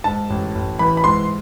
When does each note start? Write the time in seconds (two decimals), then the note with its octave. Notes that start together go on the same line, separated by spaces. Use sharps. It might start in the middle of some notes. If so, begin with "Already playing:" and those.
0.04 G#2 A5
0.30 A1
0.55 A1
0.79 E3 B5
0.97 B5
1.04 G#2 C6